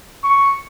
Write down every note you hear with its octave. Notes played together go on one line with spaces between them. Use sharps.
C#6